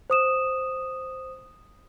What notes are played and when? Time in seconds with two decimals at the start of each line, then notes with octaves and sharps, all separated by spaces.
0.10 C5 D#6 E7